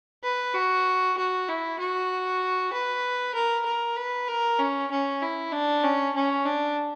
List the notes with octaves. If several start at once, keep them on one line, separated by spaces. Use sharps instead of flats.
B4
F#4
F#4
E4
F#4
B4
A#4
A#4
B4
A#4
C#4
C#4
E4
D4
C#4
C#4
D4